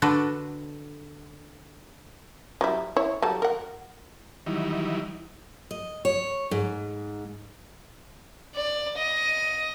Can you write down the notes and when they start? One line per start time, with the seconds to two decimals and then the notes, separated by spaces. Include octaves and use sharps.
0.02 D3 D4 F#4 A4 B4
2.61 F#3 G3 E4
2.96 E4 C#5
3.22 F#3 G3 A4
3.42 A#4 F#5
4.46 D#3 E3 F#3 G3 D#4 E4
5.71 D#5
6.05 C#5
6.51 G#2
8.55 D5
8.98 D#5